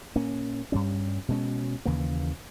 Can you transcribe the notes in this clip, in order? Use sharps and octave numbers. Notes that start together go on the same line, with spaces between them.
A#2 A#3 C#4
G2 G3 C#4
B2 G#3 C#4
D#2 C#3 E3 A#3